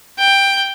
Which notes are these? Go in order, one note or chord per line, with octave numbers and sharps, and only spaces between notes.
G5